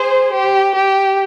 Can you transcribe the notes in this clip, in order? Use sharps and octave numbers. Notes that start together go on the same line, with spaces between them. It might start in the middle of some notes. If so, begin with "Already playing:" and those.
Already playing: G#4 C5
G4
G4